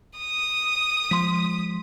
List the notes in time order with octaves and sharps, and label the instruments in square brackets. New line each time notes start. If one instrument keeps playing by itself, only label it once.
[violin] D#6
[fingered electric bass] F3 G#3 [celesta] C6 B6